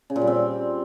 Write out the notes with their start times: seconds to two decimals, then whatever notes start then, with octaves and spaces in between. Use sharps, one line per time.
0.10 C#3
0.16 A#2
0.22 G3
0.27 C4